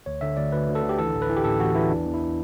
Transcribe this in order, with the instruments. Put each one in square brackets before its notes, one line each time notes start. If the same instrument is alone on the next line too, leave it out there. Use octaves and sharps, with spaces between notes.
[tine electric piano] D2 C#5
D3 E5
D2 D5
D2 B4
D2
A4
D3
G4
E3 A4
A1
B4
E3
G4
A1 A4
E4
A1 F#4
E3 E4
E2 D4
E2
E4